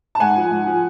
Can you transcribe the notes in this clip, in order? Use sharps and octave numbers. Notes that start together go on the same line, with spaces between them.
A5
G#2 F#5 G#5
F3
G#2
F3